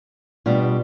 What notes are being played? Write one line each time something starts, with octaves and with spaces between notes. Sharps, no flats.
B2 G3 B3 D4 F4